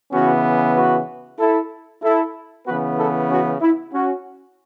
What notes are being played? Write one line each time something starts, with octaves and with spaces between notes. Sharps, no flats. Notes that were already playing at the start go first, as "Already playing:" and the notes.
C#3 E3 B3 C#4 F#4
F#4 B4
E4 A4
E4 A4
C#3 E3 B3 F#4 B4
E4 A4
C#4 F#4
E4
C#4 F#4